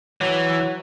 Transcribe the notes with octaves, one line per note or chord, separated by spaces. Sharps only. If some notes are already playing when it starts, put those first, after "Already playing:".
E3 F#3